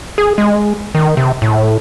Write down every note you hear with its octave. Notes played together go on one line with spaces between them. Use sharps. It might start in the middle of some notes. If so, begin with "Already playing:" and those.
G#4
G#3
D#3
C3
A2